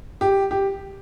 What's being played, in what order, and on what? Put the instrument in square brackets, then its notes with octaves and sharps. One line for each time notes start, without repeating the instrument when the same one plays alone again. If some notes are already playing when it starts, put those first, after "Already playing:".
[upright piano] G4
G4